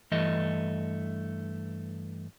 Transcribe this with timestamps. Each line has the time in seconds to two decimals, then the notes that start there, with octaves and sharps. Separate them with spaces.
0.12 G2 E3 A3 D#5